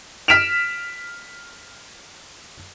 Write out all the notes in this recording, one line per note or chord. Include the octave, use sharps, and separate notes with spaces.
F6 B6 D7 E7 F7